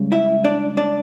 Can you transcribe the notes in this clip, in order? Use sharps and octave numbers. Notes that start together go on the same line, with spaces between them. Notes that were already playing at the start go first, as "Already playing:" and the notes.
Already playing: C#2 C#3 G3
E4 E5
D4 D5
D4 D5